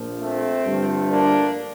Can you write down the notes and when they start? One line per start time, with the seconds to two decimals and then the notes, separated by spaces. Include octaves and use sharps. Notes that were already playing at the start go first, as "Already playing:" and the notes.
Already playing: A#1 A#2 F3
0.21 A3 C4
0.65 G2 D3 F3 A3
1.10 A#3 D4